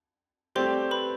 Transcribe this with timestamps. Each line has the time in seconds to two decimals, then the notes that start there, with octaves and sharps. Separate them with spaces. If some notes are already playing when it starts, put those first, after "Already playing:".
0.55 A3 C4 G4 C5 D5 C6
0.91 B4 B5